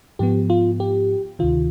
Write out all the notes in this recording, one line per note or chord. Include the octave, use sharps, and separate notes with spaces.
G#2 F3 B3 G4
F4
G4
D2 C3 D#3 F4